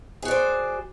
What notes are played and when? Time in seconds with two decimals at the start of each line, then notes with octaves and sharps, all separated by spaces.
0.22 G#4
0.25 F#4
0.28 D5
0.31 C5